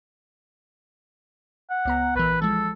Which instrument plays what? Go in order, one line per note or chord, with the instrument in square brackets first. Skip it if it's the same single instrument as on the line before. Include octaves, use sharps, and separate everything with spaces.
[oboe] F#5
[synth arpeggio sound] C#2 B3 A#5
[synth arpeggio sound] A#1 E3 [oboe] B4
[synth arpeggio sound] F3 G#3 [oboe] A4